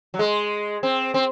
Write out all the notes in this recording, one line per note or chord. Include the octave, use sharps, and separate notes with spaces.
F#3
G#3
C4
C4